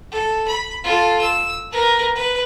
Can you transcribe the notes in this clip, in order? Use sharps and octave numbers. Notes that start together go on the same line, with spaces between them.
A4
B5
F4 A4
E6
A#4 B4
B4